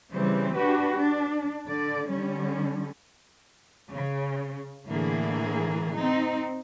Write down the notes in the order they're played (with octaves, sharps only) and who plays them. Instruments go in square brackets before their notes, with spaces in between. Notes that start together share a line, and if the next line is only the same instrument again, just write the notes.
[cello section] C#3 E3 G3 C4
D4 F#4 G4 B4
D4
D3 D5
D3 G3 C#4
C#3
A2 D3 E3 A#3 G#4
C4 D#4